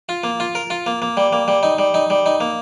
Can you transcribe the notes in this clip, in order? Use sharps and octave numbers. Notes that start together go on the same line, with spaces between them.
F4
A#3
F4
A#4
F4
A#3
A#3
G3
A#3
G3
D#4
G3
D#4
G3
D#4
A#3